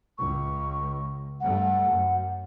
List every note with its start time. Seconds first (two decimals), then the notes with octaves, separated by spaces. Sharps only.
0.18 C#2 C#6
1.40 G2 A3 F#5
1.88 F#2